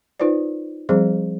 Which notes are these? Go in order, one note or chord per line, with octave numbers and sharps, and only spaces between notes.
D#4 F4 B4 C5 D5
F3 G3 C4 G#4 C5